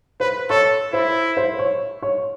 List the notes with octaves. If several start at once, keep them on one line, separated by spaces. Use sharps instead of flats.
B4 C5
A4 C#5
E4 C5
C5
C#5
C#5